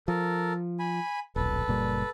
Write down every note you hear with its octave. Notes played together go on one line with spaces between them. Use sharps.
F3 A4 A#4
G#5 B5
D#1 B1 A4 B4
F#1 A#2 G3